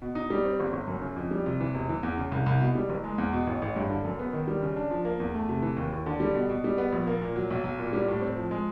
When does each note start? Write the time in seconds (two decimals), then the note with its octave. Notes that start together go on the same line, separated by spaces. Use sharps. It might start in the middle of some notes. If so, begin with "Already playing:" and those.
0.02 B2
0.15 D#4
0.30 G3
0.45 C4
0.60 G1
0.73 G1
0.87 F#2
1.02 C#3
1.16 F2
1.31 G3
1.46 C3
1.60 E3
1.74 E1
1.89 E3
2.03 E2
2.17 C#3
2.32 C2
2.46 C2
2.61 B2
2.75 G3
2.89 F#1
3.04 G#3
3.18 E2
3.33 B2
3.47 A1
3.62 A1
3.76 G2
3.90 D3
4.05 F#2
4.19 B3
4.33 D#3
4.48 G3
4.62 C#3
4.76 D4
4.90 F3
5.05 A#3
5.20 E2
5.34 A3
5.49 C3
5.62 E3
5.77 D#2
5.92 D#2
6.06 D3
6.20 G3
6.35 B2
6.50 B2
6.64 G3
6.78 B3
6.92 A#1
7.07 A#3
7.21 A#2
7.36 F#3
7.50 B1
7.64 B1
7.79 A#2
7.93 G3
8.08 A2
8.21 C4
8.36 F3
8.51 G#3